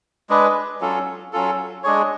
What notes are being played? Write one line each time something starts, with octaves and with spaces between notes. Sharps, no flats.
G#3 D4 G#4 B4
F#3 C#4 F4 A4
F#3 C#4 F4 A4
G#3 D4 G#4 C#5